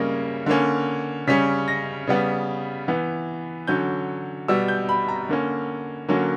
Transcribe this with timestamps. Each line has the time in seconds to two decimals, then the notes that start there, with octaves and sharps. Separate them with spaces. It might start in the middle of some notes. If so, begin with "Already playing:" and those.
Already playing: C#3 G3 A#3 C#4 A#6
0.46 D3 A#3 C#4
1.27 C#3 G3 C#4 B6
1.68 A#6
2.07 C#3 G3 B3
2.88 E3 B3
3.67 D3 F#3 C#4 G6
4.48 B2 G3 B3 E6
4.68 G6
4.89 B5
5.08 A#5
5.29 D3 A#3 C#4
6.08 D3 F#3 A#3 C#4